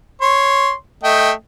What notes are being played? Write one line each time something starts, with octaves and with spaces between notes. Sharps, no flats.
C#5 C6
A3 D#5 G5